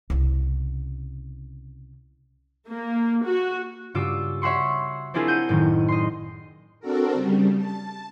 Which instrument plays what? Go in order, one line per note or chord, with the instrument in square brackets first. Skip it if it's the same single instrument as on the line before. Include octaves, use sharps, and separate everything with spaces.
[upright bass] C2 C#3
[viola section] A#3
F#4
[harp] G2 C#3 F4 F#4 D6 E6
C#5 E5 F#5 C6 C#6
C4 D4 E4 F4 G#4 A#4
F#5 G6 D#7
F#1 A2 D#3
D#5 C6
[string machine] C4 D4 F#4 A4 A#4
C#3 G3
A5